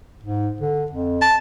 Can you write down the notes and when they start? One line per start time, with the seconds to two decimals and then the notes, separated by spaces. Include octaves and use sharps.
0.23 G#2
0.61 D3
0.91 F2
1.21 A5